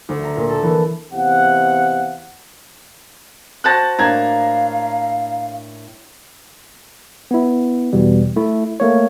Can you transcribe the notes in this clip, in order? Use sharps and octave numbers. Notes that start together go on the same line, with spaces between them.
D2
A#5
A#2
A4
E3
E2 C3 F5 F#5
F#4 C5 A5 F#6 A6 A#6
A2 A#3 D4 F5 A#5 G#6
B3 E4
E2 B2 G3
A3 E4
A3 A#3 C#5